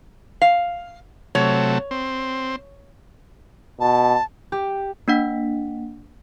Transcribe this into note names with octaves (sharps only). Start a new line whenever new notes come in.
F5
C3 F#3 A3 C#5
C4
B2 A5
G4
A#3 D4 F#5